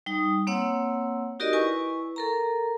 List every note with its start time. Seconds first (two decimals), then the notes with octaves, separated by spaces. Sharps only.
0.06 G3 D#4 D#6
0.47 A#3 C4 C#5 F#5 E6
1.39 D#4 F#4 G4 A#4 D5 D#5
1.53 E4 B4 G#5 C#6
2.16 A4 A#4 A#5